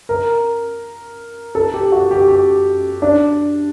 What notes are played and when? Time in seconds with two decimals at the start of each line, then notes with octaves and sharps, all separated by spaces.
0.09 A#4
1.55 A4
1.74 G4
1.92 F#4
2.11 G4
2.28 G4
3.02 D4